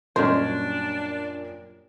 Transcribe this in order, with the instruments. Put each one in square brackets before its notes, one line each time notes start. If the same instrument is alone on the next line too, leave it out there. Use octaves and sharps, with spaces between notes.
[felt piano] F#2 A#2 G3 [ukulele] C#4 C#5 D#5 [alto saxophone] D4 [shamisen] C5